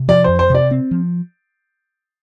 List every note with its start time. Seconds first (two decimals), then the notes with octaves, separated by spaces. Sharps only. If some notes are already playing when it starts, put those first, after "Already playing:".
Already playing: C3
0.08 F3 D5
0.24 F2 C5
0.39 C5
0.50 C3 D5
0.71 C4
0.91 F3